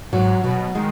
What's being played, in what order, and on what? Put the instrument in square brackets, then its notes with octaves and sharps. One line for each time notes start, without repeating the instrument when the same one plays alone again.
[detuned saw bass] G#2 [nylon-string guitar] F#3
[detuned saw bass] B2 [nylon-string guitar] F#3
[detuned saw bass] D#3 [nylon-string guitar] G#3